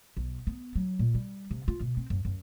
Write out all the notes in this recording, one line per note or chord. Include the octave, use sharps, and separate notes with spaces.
B1
B3
F#3
A#2
G3
C3
F4
B2
C4
F#2
F#2